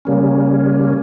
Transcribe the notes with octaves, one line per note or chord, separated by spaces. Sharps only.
C#3 G3 A#3 C#4